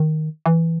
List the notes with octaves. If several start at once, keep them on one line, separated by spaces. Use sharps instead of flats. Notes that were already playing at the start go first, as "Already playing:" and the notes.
Already playing: D#3
E3